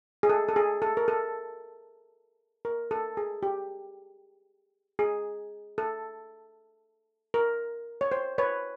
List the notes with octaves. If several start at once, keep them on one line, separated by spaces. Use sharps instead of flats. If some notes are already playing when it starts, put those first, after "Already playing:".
G#4
A4
A4
G#4
A4
A#4
A4
A#4
A4
G#4
G4
G#4
A4
A#4
C#5
C5
B4 C#5